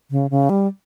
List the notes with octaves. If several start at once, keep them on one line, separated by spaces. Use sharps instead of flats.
C#3
C#3
G3